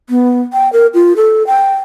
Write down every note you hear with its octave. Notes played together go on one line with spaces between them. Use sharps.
B3
G5
A#4
F4
A4
G5